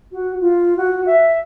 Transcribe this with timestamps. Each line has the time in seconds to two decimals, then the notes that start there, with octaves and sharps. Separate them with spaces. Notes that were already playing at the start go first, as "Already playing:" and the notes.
0.12 F#4
0.41 F4
0.77 F#4
1.06 E5